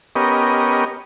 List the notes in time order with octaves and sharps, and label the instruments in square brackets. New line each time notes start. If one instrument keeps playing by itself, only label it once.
[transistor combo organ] B3 C#4 G4 A#4 D#5